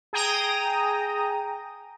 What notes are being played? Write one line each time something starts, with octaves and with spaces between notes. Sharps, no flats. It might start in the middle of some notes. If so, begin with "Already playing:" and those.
G#4 G5 A#5 D#6